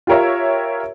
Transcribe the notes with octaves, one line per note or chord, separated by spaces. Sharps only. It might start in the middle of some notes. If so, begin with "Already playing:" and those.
F4 G4 A#4 C#5 E5